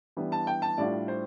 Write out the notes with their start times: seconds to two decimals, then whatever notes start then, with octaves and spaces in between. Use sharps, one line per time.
0.17 E3 G3 B3 D4
0.32 A5
0.47 G5
0.62 A5
0.78 A2 G3 D4 F4 D5
1.08 C5